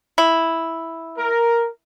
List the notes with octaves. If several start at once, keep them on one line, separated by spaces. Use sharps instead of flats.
E4
A#4